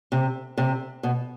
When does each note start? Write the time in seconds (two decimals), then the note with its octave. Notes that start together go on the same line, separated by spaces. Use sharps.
0.12 C3
0.58 C3
1.03 B2